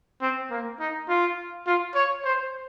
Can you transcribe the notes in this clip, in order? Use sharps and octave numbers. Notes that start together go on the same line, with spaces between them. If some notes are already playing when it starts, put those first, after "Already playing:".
C4
A#3
D#4
F4
F4
C#5
C5